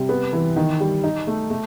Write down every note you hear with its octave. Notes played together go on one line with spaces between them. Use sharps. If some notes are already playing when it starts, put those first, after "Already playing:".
Already playing: C3 G3
B3
E3
D#3
G3
D#4
A3
A3